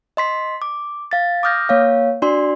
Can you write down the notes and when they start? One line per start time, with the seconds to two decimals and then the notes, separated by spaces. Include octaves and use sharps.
0.17 D#5 C6 B6
0.62 D6
1.11 F5 A6
1.43 D6 D#6 F6 G6 A#6
1.69 A#3 C#5 F5
2.22 D4 F#4 D5 C6